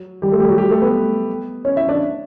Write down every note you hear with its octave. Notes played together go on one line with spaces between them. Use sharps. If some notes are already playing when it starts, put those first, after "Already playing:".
Already playing: F#3
G3 G4
A3 A4
G3 G4
F#3 F#4
G3 G4
A3 A4
B3 B4
C#4 C#5
E4 E5
D4 D5